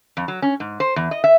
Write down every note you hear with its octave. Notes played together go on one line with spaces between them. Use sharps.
F2
F#3
C#4
G#2
C5
E2
D#5
E5